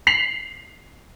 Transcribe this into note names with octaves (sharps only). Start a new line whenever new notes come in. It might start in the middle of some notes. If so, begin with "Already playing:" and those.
B6 C7 F7 F#7